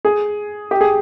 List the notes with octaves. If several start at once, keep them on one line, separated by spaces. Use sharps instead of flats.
G#4
G4
G#4